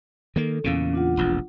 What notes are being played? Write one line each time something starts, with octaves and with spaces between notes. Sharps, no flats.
D#3 A#3 A4
E2 A#2 C#3 C#4 F5
D4 F4 F#5
E1 A#1 F2